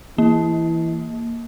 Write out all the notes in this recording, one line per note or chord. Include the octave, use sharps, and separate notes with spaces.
E3 A#3